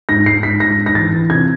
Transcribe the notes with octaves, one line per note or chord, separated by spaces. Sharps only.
G#2 A#6
G#2 C7
G#2 B6
G#2 A#6
G#2
A#6
E3 A6
E3
C3 G#6